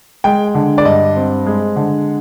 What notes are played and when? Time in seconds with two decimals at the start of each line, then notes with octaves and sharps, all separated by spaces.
0.24 G#3 G5
0.55 D3
0.78 D5
0.85 G2 D#5
1.16 C4
1.46 G#3
1.76 D3